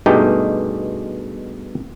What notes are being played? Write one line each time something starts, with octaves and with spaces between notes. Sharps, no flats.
G2 B2 G#3 A3 D#4 G4